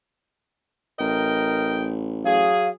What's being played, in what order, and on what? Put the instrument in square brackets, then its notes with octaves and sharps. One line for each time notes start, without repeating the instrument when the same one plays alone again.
[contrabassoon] A1 [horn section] A#4 D#5 G5
[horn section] F#3 G#4 [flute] F5